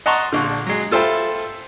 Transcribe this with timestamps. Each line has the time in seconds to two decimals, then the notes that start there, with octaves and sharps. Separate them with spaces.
0.06 D#5 F#5 A5 A#5 C6 C#6
0.33 A#1 D3
0.67 F#3 G#3
0.91 F4 A4 C5 E5 G5 B5